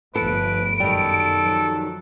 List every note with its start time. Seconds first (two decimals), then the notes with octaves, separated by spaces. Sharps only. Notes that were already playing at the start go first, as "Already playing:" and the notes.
0.15 G1 F3 A3 A4 B4 D7
0.80 F#2 B2 D#3 G3 A4
1.42 F3 F#3